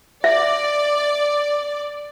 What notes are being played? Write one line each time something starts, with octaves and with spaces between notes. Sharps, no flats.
D5 E5